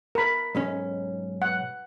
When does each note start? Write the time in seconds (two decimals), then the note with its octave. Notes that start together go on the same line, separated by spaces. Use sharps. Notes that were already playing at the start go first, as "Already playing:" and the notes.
0.15 A#4 B5
0.55 B1 G#2 C#4
1.42 F#5